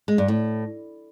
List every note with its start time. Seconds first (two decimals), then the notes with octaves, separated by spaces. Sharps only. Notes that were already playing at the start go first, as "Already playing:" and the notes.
0.08 G#3
0.18 G2
0.28 A2